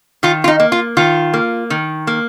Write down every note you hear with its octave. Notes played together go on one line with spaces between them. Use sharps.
D#3 F4
F4
D#4
A#3
F4
D#3 F4
A#3
D#3
A#3